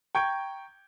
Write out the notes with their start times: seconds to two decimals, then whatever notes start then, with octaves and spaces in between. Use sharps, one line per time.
0.15 G5 A#5 C#6 G6 G#6 D7